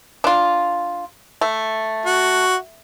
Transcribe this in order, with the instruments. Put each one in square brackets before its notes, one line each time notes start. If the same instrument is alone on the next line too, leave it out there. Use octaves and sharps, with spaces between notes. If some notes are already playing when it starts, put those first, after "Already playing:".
[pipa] D4 F4
A3
[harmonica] F#4